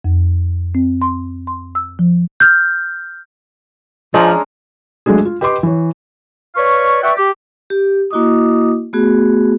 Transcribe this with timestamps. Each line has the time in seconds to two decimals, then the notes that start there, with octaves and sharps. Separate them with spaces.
0.05 F2
0.75 C4
1.02 C6
1.47 C6
1.75 E6
1.99 F3
2.40 F6 G6
4.14 F3 G#3 C#4 D4 A#5
5.06 F#3 G#3 A3 D4 G#4
5.25 F4
5.41 G4 B4 D#5 G5 C6 D6
5.63 E3 C#5
6.55 B4 C#5 D5 F5 C#6
7.02 B4 D5 E5 F#5 G5 C#6
7.16 G4
7.70 G4
8.11 A#3 E4 F#4 D#5 D6 D#6
8.93 A3 B3 F#4 G#4